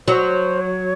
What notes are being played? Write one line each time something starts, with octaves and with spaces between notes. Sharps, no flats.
F#3 C5
C#5